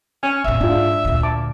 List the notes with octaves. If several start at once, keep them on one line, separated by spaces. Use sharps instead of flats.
C#4 G#5
G2 A#2 E5
G#2 D4 F4
D2 A#2
A5 D6